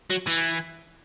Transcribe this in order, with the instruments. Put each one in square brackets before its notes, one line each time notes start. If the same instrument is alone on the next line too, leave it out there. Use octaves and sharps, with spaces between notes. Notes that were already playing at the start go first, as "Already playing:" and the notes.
[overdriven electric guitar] F#3
E3